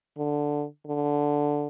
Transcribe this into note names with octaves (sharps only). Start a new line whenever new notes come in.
D3
D3